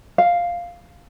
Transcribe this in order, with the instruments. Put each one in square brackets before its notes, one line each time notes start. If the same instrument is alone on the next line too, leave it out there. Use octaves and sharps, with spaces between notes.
[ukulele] F5